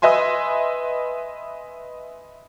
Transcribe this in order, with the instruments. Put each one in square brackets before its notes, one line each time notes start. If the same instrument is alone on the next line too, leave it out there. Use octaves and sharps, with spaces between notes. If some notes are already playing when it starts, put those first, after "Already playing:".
[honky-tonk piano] B4 D#5 E5 G#5 C6